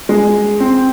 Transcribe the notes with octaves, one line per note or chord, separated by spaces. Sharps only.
G#3
C4